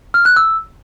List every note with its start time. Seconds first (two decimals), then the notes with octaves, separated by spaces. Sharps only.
0.14 F6
0.25 F#6
0.36 E6